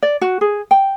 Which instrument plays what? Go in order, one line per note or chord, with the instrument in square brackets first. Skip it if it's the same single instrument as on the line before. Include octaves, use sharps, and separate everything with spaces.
[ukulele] D5
F#4
G#4
G5